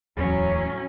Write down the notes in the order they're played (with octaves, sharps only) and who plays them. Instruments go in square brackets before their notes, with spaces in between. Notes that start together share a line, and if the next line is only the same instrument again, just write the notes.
[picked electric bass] D1 E2 [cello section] A2 F#3 C#4